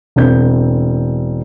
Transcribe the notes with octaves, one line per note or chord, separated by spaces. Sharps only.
E1 C4 G6